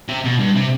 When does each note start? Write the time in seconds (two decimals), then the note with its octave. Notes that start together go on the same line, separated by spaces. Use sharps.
0.09 C3
0.24 B2
0.39 G2
0.55 C3